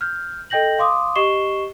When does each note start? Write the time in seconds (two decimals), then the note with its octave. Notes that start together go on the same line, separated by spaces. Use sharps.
0.01 F6 G6
0.50 A4 D#5 G5 G6 A#6 F#7
0.79 F5 C6 D6 D#6
1.15 G4 D#5 C#6 C7 E7 G7